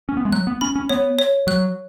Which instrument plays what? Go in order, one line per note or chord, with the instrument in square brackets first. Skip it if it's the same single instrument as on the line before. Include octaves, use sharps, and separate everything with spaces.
[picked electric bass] C#4
B3
G#3
[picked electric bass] F#3 [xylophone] F#6
[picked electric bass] B3
[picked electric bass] C#4 [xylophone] B5
[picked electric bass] C#4
[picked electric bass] B3 [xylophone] C#5
[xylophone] C#5
[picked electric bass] F#3 [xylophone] F#6